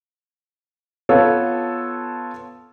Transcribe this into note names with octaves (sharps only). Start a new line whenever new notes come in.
B3 F4 A4 C#5